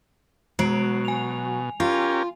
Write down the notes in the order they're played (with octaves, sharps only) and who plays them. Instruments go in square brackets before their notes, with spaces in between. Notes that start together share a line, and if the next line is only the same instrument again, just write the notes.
[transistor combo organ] B2 [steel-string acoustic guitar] F#3 [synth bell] G#3 C7 D7
[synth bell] G#5 F7
[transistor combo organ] C#4 G4 A#4 [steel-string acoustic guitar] F4